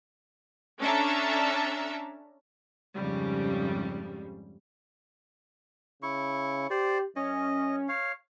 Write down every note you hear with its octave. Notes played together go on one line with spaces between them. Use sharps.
C#4 D4 A4 E5 A5 A#5
F2 G#2 C#3 G3
C#3 E4 C#6
G4 C5 D5
F#2 C#4 D#5
C#5 F5